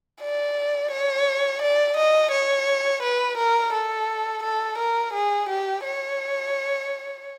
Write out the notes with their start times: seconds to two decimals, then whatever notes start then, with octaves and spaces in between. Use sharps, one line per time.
0.21 D5
0.91 C#5
1.62 D5
1.97 D#5
2.32 C#5
3.03 B4
3.38 A#4
3.73 A4
4.43 A4
4.79 A#4
5.14 G#4
5.49 G4
5.84 C#5